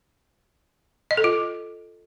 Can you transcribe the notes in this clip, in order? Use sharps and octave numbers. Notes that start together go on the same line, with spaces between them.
D#5
A4
F4